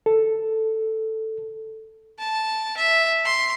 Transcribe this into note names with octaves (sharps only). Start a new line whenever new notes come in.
A4
A5
E5
C6